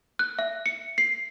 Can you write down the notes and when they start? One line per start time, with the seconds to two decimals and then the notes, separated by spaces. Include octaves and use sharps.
0.19 F#6
0.39 E5
0.66 C#7
0.98 C7